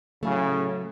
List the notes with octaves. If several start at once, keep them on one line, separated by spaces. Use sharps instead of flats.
A2 C#3 F#3 A3